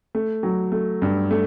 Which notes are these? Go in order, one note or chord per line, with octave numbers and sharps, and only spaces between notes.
A3
F#3
A3
G2
A3